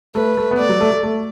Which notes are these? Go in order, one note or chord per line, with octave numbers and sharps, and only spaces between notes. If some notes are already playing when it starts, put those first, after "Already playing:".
A3 B4
A3
B3
A3 D5
F#3
A3
A3
A3